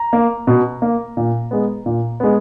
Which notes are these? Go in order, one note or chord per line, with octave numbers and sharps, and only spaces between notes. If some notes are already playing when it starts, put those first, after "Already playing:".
Already playing: A#5
A#3
B2
A#3
A#2
G#3 B3
A#2
G#3 B3